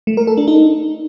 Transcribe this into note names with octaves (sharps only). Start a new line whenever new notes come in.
A3
A#4
A4
D4
D#4